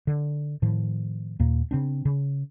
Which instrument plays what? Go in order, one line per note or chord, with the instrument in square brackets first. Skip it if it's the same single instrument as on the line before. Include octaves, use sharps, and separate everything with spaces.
[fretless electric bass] D3
A2 D#3 F3
D#2 A#2 A#3
C#3 C4 D4
C#3